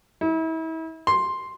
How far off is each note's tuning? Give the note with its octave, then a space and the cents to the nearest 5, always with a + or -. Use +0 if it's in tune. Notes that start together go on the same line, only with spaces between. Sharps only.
E4 -35
C6 +5